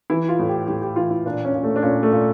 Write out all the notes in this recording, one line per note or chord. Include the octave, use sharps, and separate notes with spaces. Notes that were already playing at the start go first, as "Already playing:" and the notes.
E3 E4
F4
A2
G4
A2 G4
G4
E3 F4
E4
A#2 D4
C#4
A#2
A3
D4
A#2 C#4
A3
A#2